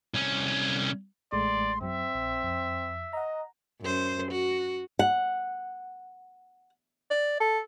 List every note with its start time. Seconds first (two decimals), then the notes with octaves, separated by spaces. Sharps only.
0.14 C2 C#4
1.32 A1 G#3 A3 D5 C6
1.81 F#2 F#3 C4 E5
2.14 A#1
2.43 F2
3.13 D#5 F#5 A#5
3.82 F#2 C5
4.31 F#4
4.99 F#5
7.11 D5
7.40 A4